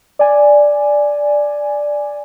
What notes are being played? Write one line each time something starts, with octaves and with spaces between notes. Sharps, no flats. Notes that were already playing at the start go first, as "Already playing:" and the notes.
D5 G#5